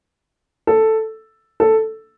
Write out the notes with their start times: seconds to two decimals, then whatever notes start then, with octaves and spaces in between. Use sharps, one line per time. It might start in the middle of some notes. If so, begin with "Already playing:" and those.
0.67 A4
1.60 A4